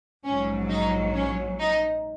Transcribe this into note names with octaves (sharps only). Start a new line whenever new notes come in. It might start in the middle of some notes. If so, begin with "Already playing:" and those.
A#1 G#2 F#3 C#4
D#4
C#4
D#4